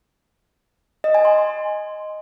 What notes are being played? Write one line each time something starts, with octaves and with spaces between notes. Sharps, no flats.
D#5
G#5
C6